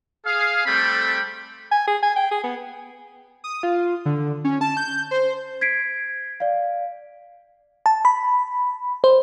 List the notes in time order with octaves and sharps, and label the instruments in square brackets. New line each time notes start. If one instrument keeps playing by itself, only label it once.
[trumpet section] G#4 F5
G3 A3 C4 A4 G5 B5
[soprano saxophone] G#5
G#4
G#5
G5
G#4
B3
[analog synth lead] D#6
F4
D3
C#4
A5
G6
C5
[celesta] G#6 B6 C7 D7
D5 F5
[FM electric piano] A5
B5
C5